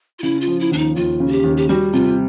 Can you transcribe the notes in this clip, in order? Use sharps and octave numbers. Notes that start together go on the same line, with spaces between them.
F4
C#3 E4
F4
F3
E4
D#2 D4
D#4
D#2 F4
C#3
F#4
G4
D#2
G4
G3 F#4
C3 F4